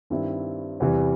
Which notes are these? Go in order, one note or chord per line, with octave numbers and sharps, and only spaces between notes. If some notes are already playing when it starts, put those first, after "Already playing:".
G2 D#3 G3 C4 E4
E2 C3 E3 G3